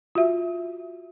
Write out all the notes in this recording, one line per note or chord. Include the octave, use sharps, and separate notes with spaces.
F4 F#4 E5